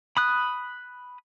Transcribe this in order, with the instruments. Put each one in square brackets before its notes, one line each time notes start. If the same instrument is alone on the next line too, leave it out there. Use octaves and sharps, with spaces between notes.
[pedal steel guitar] B5 D#6 F#6